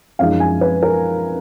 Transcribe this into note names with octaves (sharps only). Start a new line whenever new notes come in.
F#2 F3 G#3 D#4 F5
G#5
B4
A#4